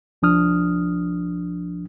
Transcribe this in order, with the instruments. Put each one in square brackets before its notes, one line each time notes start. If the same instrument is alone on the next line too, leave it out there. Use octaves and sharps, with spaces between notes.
[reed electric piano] C2 F3 D4 D#6 F6